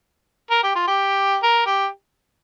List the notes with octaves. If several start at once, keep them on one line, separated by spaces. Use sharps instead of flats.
A#4
G4
F4
G4
A#4
G4